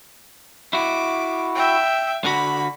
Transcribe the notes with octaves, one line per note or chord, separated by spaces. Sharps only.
E4 F#4 D6
E5 G5
D3 F#4 B5